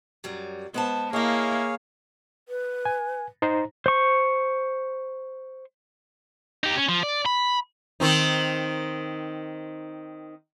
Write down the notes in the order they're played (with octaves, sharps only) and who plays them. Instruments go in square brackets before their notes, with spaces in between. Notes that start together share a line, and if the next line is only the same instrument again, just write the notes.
[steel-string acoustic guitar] F#2 F#3 G3
[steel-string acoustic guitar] G#3 C5 A5 [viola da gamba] B3
[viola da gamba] A#3 [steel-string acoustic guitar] E4 D#5 [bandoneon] G#4 C#5 F5
[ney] B4
[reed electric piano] G#5
D#4 C5 A#5
[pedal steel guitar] C5 C#6
[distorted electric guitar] D#4 G4
C#4
F3
D5
B5
[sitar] D#3 C4 D#4